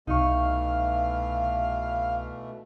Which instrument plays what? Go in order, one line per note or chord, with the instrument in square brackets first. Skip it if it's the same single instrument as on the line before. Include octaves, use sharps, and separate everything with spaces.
[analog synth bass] C2 [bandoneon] B2 E3 A3 [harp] D#4 C#6 [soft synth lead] F5